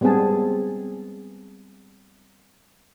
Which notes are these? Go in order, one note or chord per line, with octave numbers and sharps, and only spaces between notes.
G3 G#3 B3 C4 G#4 A5